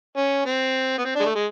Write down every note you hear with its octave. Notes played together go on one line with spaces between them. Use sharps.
C#4
C4
B3
C4
G#3 D4
A3
G#3